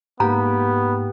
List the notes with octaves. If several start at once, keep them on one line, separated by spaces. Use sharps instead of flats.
G#2 A#3 B3 G4 A#5